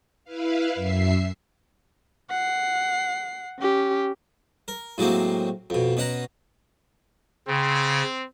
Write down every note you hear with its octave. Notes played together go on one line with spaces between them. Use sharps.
E4 B4 F5
F#2 E5 C7
F#5 C7
C#4 G4
A#4
A2 F#3 G#3 A#3 C4
F2 B2
B2 C#4 F#5 A#5
C#3 C4